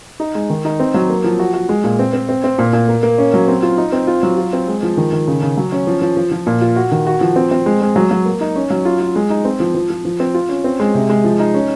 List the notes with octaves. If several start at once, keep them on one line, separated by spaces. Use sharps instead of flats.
D#4
G#3
D#3
D#4
C4
F#3
A#3
F3
F#4
F#4
G#3
A#2
C4
C4
C4
C4
A#2
A#2
A#3
A#3
C#4
F#3
C4
F4
D#4
C4
F4
F#3
F4
C4
G#3
F3
D#3
D#3
C#3
C#3
F#3
C#4
F3
F3
F3
F3
A#2
F4
F#4
D#3
F#4
F3
C4
C4
G#3
G#3
F#3
F#3
A#3
D#4
C#4
F#3
F4
F4
G#3
D#4
C4
F3
F3
F3
F3
C4
F4
C#4
C4
G#3
C3
G#3
F3
D#4
C#4